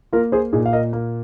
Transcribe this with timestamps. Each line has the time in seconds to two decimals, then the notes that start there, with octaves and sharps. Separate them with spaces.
0.13 A#3 F4 A#4
0.32 G#4 C5
0.53 A#2 D#4 G#4
0.66 F5
0.73 A#4 D#5
0.93 A#3